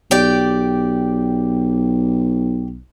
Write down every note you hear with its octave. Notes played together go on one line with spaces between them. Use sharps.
B1 G4 D5 G5